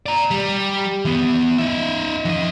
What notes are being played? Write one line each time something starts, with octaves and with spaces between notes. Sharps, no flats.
D5 A#5
G3
E3 B3
D#4 E5
F2 D#5